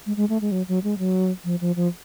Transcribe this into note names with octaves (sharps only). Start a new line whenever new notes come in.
G#3
G#3
A3
G#3
F#3
F#3
G#3
F#3
F3
F3
F3